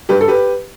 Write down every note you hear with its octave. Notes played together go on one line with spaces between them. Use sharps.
G2 G4 B4
A4
G4 B4